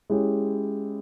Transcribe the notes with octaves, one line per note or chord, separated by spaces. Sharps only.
G#3 C#4 E4 G4